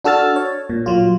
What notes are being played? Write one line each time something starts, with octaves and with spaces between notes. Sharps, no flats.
D4 F#4 A4 E6 F6 A6
C#5
A#2
A#2 F#3 F4